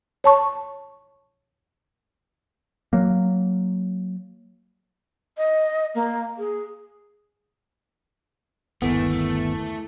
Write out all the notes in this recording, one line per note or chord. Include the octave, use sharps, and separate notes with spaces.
C#5 A5 C#6
F#3 A#3
D#5
A#3
G#4
G1 D#2 E3 A3 B3 A#4